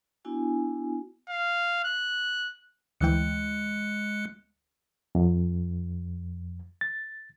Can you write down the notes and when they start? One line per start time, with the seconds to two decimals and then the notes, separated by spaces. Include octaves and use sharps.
0.25 B3 D4 E4 F#4 G#5
1.29 F5
1.84 F#6
3.01 D2 E3 G#3 G5 F#6 C#7
5.15 F2
6.81 A6